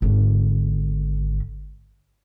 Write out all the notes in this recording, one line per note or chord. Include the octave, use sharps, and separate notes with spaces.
G#1 D3